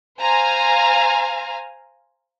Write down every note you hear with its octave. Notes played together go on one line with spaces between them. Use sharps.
C5 F5 G#5 A#5